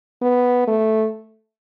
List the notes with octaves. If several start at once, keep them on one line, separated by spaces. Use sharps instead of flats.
B3
A3